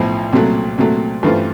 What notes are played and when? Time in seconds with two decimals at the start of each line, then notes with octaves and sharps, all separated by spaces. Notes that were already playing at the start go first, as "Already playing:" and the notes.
Already playing: B1 A2 F3
0.33 C2 A#2 F#3 A3
0.78 C2 A#2 F#3 A3
1.23 G2 E3 A3 C4 F4